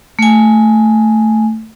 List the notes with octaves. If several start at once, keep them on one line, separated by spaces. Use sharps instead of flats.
A3 G#5